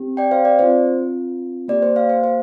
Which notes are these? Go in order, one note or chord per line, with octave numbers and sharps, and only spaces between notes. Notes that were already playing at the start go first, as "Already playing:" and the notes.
Already playing: C4 G4
D5 G5
C5 F5
D5
C4 F4 C5
A#3 G4 D5
C5
C5 F5
C5
C5